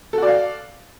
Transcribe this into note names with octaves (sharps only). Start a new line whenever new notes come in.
F#4 A4 D5 F5